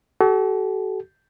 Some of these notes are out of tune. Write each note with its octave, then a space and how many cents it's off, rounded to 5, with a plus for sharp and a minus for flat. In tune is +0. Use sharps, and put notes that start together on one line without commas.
F#4 +45 A4 -35